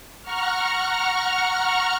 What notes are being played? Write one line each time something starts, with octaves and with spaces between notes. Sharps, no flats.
F#5 A#5 C#6 F6